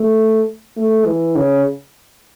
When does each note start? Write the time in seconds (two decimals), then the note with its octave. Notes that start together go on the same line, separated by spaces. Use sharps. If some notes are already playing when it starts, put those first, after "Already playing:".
Already playing: A3
0.77 A3
1.06 E3
1.36 C#3